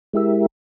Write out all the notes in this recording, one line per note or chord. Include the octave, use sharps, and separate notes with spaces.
G#3 E4 G4 A#4 E5